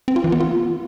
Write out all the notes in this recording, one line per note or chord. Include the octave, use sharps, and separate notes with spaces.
C4
F4
E3
B3
F4